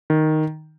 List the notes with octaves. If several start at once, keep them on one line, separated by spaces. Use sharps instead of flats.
D#3